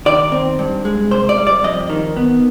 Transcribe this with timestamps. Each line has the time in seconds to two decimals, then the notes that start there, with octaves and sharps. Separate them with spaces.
0.06 D#3 D5
0.32 C4
0.59 G2
0.85 G#3
1.11 C3 C5
1.29 D5
1.38 G3
1.47 D5
1.64 F2 D#5
1.90 D#3
2.17 B3